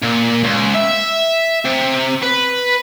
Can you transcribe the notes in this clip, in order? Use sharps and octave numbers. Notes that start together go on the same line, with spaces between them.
A#2
C#2
E5
C3
B4